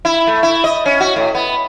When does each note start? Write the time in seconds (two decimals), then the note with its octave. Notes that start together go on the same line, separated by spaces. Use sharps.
0.05 E4
0.27 A3
0.43 E4
0.64 D#5
0.86 C#4
1.00 F#4
1.16 A2
1.35 B3